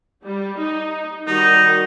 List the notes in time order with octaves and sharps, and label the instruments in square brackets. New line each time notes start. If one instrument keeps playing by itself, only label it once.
[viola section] G3
D#4
[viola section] D#3 G3 F#4 [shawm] D#4